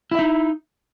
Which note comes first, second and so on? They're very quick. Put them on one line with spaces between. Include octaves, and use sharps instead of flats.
E4 E5 D#4